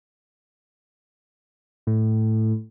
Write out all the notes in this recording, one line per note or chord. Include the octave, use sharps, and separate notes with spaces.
A2